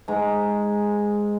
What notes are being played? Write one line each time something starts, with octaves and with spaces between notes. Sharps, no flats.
G#2 G#3 A#5